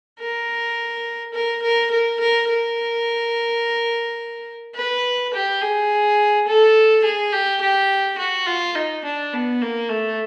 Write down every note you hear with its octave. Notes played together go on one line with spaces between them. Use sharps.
A#4
A#4
A#4
A#4
A#4
A#4
B4
G4
G#4
A4
G#4
G4
G4
F#4
F4
D#4
D4
B3
A#3
A3